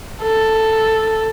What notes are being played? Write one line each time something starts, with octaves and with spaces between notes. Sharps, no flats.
A4